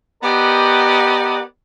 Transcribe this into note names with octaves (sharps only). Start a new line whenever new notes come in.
B3 G4 A#4 D5 D#5 F#5